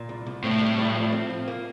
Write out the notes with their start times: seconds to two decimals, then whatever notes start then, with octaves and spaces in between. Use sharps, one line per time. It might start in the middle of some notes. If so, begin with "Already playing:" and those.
Already playing: A#2
0.09 C2
0.27 C2
0.44 A2 C4
0.61 G3
0.78 G3
0.96 F3
1.12 C4
1.30 F3
1.48 A#3